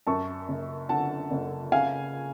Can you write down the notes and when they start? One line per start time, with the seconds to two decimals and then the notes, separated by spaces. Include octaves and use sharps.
0.07 F#2 A5 C#6
0.48 F#1
0.89 D3 F#5 A5
1.31 F#1
1.72 C#3 F5 G#5